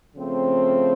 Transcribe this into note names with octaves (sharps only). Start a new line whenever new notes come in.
C#3 F3 A3 C4